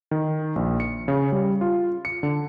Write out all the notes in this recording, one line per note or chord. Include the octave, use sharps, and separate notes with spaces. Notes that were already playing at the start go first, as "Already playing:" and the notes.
D#3
A#1
C#7
C#3
G3
F4
C#7
D3